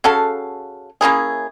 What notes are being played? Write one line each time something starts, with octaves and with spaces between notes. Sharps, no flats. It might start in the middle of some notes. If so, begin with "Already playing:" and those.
C#3 F#4 A4 F5
A#3 C#4 E4 G#4